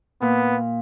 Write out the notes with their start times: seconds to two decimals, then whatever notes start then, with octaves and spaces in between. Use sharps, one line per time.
0.22 A#2 B3